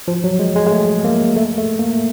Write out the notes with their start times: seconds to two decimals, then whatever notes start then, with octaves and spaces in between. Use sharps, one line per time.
0.08 F3
0.24 F#3
0.39 G#3
0.56 G#3
0.67 G#3
0.71 A3
1.04 A#3
1.36 A3
1.58 A3
1.79 A#3